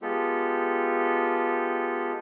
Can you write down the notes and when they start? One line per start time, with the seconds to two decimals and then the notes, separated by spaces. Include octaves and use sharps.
0.02 G#3 B3 F4 G4 A4